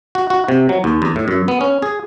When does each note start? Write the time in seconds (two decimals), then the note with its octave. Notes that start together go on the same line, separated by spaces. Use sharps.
0.15 F#4
0.30 F#4
0.48 C3
0.69 F#3
0.84 D#2
1.02 E2
1.16 A2
1.28 F#2
1.48 B3
1.61 C#4
1.82 G#4